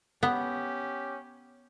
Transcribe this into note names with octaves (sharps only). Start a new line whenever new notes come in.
B3 C#4 G4